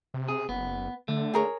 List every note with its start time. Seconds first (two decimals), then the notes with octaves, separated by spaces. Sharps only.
0.14 C3
0.29 G#4
0.49 F#1 B3
1.08 D3 A3
1.34 G#4 A#4 C#5